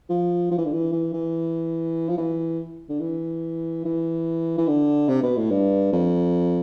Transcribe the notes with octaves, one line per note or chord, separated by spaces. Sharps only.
F3
F3
E3
D3
E3
E3
E3
F3
E3
D3
E3
E3
E3
D3
C3
B2
A2
G2
F2